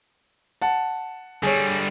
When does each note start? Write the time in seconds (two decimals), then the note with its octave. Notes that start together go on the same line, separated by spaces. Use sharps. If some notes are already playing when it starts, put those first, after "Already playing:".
0.62 F#5 A5
1.43 D3 G3 G#4 C#5